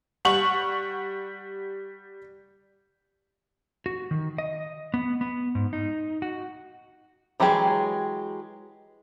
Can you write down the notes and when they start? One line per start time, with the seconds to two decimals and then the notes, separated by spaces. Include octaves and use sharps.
0.25 G3 F#5 C#6 F#7
3.86 F#4
4.11 D#3
4.38 D#5
4.94 B3
5.21 B3
5.55 G#2
5.73 D#4
6.22 F#4
7.40 E3 F#3 G#3 G4 G#4